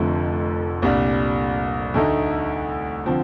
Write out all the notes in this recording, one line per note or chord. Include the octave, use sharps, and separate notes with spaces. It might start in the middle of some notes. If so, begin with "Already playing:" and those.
Already playing: F1 F2 D3 F3 A3
C2 A#2 G3 D4
D2 D3 A3 D#4
D3 F3 C4